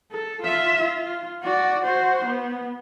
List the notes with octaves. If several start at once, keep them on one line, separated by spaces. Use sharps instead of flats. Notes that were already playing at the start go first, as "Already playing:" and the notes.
A4
F4 E5
F4
F#4 D5
F#4 C5
B3